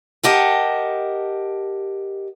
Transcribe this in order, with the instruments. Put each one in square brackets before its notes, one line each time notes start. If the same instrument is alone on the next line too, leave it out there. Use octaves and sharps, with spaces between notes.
[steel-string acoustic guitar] G4 A#4 D#5 F#5 G5 A5